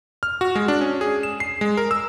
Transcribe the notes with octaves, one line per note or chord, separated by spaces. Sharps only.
F6
F#4
G#3
D4
C#4
G#4
E7
C7
G#3
A#4
E6